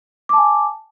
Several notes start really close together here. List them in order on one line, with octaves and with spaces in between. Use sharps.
D6 A5 G#5